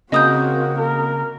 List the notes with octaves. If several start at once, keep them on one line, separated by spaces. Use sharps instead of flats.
C#3 A#3 C4 F#4 D#5 D#6 G6
A#4